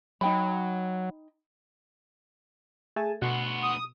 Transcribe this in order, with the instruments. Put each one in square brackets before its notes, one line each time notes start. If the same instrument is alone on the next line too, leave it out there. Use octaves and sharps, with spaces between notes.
[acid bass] F#3 [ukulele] D#4 G5 B5
[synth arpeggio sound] A3 [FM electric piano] G#4 G#5 A5
[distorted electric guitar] D2 B3 [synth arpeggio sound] B2 [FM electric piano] F#5 C6 C#6
[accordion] D#6